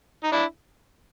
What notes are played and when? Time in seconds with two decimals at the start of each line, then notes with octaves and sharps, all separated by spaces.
0.24 D#4
0.32 D4 E4